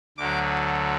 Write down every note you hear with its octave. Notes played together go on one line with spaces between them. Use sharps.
D2 D3 F#3 D6